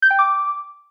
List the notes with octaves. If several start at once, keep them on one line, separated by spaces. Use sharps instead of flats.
G6
G5
D6